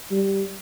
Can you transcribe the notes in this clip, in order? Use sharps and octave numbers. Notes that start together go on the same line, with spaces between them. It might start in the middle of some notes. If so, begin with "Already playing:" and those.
G3